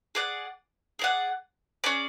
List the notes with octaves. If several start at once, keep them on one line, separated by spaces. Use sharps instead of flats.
G#4 D5 F#5
G#4 D5 F#5
C#4 G#4 D5